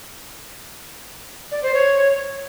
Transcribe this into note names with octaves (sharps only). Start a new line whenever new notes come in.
D5
C5
C#5